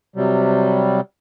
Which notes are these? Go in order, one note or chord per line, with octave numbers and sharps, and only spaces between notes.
C3 F#3 G3